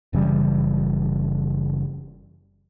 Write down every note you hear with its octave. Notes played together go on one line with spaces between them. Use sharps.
F#1 C#3 E3 G3